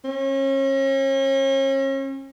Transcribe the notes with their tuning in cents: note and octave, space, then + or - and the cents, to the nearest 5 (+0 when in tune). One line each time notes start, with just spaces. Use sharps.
C#4 -40